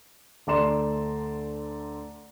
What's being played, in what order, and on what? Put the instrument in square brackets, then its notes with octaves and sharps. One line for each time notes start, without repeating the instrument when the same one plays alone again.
[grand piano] D2 A3 D5 A#5 C6 E7